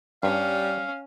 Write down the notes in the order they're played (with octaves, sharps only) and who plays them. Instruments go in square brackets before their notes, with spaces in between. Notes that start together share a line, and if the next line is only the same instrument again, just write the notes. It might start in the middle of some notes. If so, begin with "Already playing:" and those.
[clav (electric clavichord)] G2 [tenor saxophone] G3 [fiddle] C#4 [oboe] F5